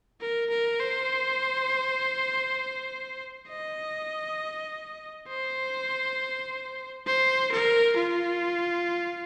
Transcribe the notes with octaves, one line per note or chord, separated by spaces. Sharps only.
A#4
A#4
C5
D#5
C5
C5
A#4
F4